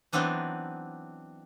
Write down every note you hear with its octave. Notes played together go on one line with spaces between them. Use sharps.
E3 F#3 B3 C4 D4 D#4